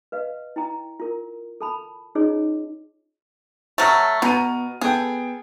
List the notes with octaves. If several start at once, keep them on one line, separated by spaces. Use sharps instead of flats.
B4 D#5 F5
E4 G5 A#5
F4 A#4
A4 A5 B5
C#4 D#4 F4 G#4 C#5 D#5
F#3 A3 C#6 F6 A#6
B2 B3 A#5 D#7
B3 G#4 A4 G5